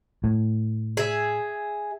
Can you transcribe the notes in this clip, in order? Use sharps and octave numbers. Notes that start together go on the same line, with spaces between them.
A2
G#4 E5